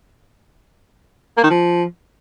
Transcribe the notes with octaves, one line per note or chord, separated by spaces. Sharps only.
A#3
D#3
F3